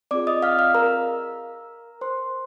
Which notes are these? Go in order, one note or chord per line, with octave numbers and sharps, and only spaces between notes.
C4 F4 G#4 D5 D6
D#5 D#6
F5 F6
F5 F6
A#4 A#5
C5 C6